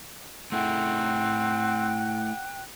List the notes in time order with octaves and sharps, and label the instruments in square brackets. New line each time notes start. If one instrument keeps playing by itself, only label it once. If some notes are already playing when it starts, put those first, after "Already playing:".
[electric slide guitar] A3 E4 G#4 [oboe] C4 [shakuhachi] F#5 [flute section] G5 F#6